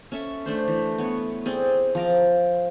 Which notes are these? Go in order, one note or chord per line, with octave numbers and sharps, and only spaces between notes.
C#4 A4 E5
A3 D4 C5
E3
B3 C#5
C4 G#4 D5
F3 A#5 D6